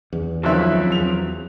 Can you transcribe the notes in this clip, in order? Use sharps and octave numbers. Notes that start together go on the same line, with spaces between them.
E2
C#2 D#3 F3 F#3 C4 E5 F#6
E2 F7